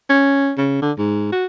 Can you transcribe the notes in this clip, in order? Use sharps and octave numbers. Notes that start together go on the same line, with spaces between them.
C#4
C#3
D3
G#2
F#4